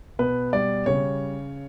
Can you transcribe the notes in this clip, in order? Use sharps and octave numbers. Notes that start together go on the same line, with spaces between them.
B2 B4
G3 D5
C#3 C#5